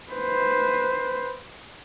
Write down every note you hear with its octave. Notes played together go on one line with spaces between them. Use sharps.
B4 C5